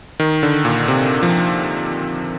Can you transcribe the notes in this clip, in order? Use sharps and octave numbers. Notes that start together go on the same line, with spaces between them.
D#3
D3
A#2
C3
F3